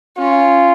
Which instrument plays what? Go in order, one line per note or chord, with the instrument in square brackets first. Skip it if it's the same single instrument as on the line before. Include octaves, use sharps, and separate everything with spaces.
[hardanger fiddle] C#4 [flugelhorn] F4